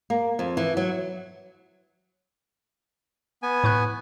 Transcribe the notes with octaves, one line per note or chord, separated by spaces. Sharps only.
A#3
F2
E3
F#3
B3 G#5
A2 C#6 F#6